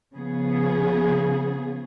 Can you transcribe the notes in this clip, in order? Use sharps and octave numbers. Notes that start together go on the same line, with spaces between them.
C#3 F3 B3 G#4